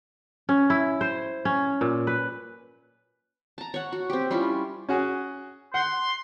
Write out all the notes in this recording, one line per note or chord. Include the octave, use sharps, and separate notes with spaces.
C#4
E4
C5
C#4
A#2
B4
A5 A#5
C#5 F#5
F#4
C4 G4
G3 C#4 E4 F4
C#4 F#4 G#4
F#5 C6